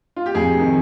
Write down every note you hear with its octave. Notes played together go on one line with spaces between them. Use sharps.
F4
G4
F2 G#4
C3 D#3